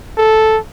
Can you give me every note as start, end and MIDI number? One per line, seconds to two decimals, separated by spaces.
0.17 0.58 69